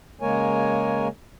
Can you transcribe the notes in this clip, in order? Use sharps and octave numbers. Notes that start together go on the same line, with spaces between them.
C#3 G#3 A#3 A#4 C#5 G#5